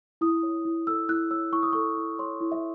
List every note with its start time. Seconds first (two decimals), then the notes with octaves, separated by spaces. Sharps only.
0.21 E4 D#6
0.43 C#5
0.65 E4
0.87 A4 E6
1.09 E4 F#6
1.30 C#5 E6
1.53 E4 C#6
1.63 D#6
1.73 A4 C#6
1.97 E4
2.19 C#5 C6
2.40 E4
2.52 E5